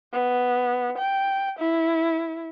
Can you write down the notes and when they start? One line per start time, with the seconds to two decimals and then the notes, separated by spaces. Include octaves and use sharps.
0.12 B3
0.98 G5
1.59 E4